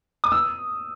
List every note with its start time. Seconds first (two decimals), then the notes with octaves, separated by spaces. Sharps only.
0.24 D#6
0.32 E6